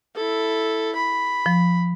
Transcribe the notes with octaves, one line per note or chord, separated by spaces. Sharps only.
E4 A4
B5
F3